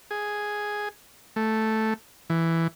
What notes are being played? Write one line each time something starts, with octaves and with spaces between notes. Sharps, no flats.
G#4
A3
E3